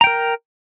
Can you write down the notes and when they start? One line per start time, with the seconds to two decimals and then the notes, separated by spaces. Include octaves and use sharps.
0.01 A#5
0.04 G5
0.07 A#4